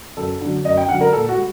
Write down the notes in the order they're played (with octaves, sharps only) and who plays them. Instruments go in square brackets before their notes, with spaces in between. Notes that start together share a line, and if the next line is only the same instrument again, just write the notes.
[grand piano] F#2 A4
D3 F#3
F#2 D#5
G5
D3 F#3 F#5
A#4
A#2 A4
F#4
G3